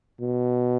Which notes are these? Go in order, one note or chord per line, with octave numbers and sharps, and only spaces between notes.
B2